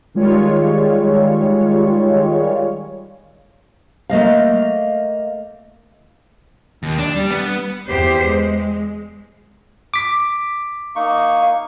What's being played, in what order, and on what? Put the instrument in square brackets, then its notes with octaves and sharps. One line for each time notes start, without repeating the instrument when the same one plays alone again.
[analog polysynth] D#3 G3 G#3 F4 C#5
[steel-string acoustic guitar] A3 A#3 D#5 F5
[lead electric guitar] D#2
D4
G3
B3
[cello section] E2 G4 C5
G#3
[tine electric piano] D6 B6
[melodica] A#3 D#4 C#6